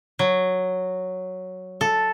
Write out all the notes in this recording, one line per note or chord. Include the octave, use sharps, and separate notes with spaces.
F#3
A4